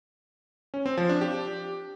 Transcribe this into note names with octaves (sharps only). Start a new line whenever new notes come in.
C#4
C4
F3
D4
G4